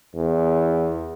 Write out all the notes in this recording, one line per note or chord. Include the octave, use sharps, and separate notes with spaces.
E2